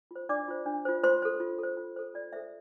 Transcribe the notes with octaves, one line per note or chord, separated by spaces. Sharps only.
F4 C5
D4 D5 D6
F4 C5
D4
F4 C5
F4 C5 C6
A4 C5
F4
A4 C5
F4
A4 C5
F4 D5
A4 C5 E5